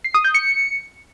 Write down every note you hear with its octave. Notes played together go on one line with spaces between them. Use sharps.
C7
D#6
G6
C#7